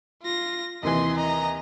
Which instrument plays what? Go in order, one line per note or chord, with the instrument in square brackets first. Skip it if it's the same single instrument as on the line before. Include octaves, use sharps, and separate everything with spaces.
[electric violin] F4 A#6
[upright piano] D#2 C3 E3 [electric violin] D#5 C6
[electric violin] D#5 A#5